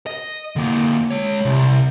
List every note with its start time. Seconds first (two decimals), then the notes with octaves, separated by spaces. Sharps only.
0.07 D#5
0.56 D3 A#3
1.10 G#3 C#5
1.45 C2